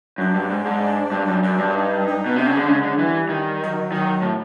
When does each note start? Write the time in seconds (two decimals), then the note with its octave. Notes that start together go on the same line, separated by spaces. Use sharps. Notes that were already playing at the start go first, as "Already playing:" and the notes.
0.18 F#2 D4
0.34 G2
0.50 G#2
0.66 G#2
1.12 G2
1.28 F#2
1.43 F#2 D4
1.58 G2
1.74 D#4
2.05 D#4
2.26 B2
2.36 C3 D4
2.46 C#3
2.57 D3
2.67 C#3 G#3
2.83 D3
2.98 E3 G3
3.29 D#3
3.60 F#3
3.92 D#3 F#3
4.22 A2